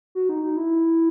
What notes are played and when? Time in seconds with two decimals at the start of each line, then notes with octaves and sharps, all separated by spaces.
0.15 F#4
0.29 D#4
0.43 D#4
0.57 E4